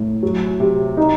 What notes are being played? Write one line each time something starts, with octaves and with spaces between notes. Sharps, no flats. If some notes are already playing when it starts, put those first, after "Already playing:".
Already playing: A2
F#3
C3
D#4